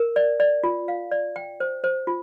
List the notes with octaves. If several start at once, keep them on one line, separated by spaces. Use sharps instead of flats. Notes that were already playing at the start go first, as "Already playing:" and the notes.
Already playing: A#4
D5
D5
F4
F5
D5
G5
C5
C5
F4